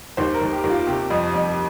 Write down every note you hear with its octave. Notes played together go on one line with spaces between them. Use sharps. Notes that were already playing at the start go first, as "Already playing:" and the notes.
D#2 C5
A#4
D#2
G4
D#2
F4
C3 G4
F2
F2